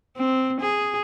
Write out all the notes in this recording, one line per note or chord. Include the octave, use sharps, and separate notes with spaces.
C4
G#4